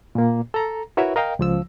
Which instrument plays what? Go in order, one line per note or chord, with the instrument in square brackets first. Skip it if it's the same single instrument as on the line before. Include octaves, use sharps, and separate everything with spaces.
[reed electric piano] A#2 A#3
A4 A#5
E4 F#4 A#4 B4 C#5 E5
A#4 D#5 F5 G5
C#2 F3 E6